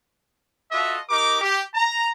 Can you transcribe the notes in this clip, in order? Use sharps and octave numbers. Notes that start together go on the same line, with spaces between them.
F4 F#4 A4 D#5 E5
D#4 G4 A#4 D6
G4
A#5